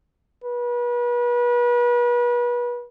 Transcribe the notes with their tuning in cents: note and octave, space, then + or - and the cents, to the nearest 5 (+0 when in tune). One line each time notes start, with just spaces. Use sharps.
B4 -35